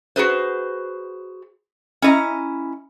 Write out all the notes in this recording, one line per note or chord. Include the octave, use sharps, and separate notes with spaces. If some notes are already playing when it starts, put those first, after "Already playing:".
F#4 G#4 B4 C5
C#4 E4 D#5 A#5